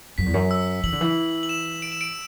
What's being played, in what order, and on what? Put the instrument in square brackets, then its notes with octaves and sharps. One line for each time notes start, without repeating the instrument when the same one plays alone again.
[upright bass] F#2 [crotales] B6
[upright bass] E2
F#2
[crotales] E6
[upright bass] E3 [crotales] F#7
[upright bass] D3
E3
[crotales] F#7
E7
D7
E7
D7